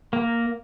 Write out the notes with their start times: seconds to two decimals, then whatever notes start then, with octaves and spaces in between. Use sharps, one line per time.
0.13 A#3